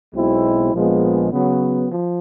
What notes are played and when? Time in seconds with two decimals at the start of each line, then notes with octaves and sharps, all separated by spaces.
0.14 B1 B2 G#3 C4 E4
0.73 A#1 A#2 F3 G#3 B3
1.32 C#3 F#3 B3
1.91 F3